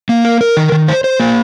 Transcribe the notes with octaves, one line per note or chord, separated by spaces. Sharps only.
A#3
A#4
A#4
D#3
D#3
C5
C5
A#3